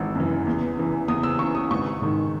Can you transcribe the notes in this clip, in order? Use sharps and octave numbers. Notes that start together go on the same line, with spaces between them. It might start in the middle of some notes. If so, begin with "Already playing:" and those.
Already playing: G#1 E3 E6
F#2 E3
E2
C#3 E3
E2 D#6
E6
C#3 E3 C#6
D#6
G#1 C#6
G#2 D#3